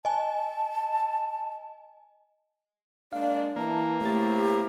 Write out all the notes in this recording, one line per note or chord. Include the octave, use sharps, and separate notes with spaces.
D#5 G#5 A5
G#3 A#3 D4 D5 F5
E3 A#3 A5
C#3 A3 C4 E4 G4 A6